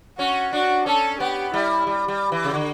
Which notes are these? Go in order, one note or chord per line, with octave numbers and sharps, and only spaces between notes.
C#4 F#4
D4 F#4
C#4 A4
B3 G4
G3 E4
G3
G3
E3
C#3
D3